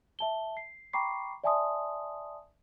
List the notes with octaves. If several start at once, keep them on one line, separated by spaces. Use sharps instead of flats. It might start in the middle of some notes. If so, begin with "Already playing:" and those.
E5 A5 G7
C7
G5 A#5 B5 C#6 D6 C7
D5 E5 G#5 A5 C6 D#6